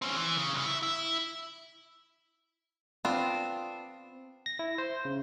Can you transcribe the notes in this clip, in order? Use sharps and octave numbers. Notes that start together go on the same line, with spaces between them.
C4 C#4
E3
C#3
C2 C#3
E4
E4
B3 C4 D4 F4
A#6
E4
C5
C#3